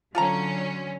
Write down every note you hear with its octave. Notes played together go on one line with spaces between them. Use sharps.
D3 F#3 C#4 F4 A4 A#5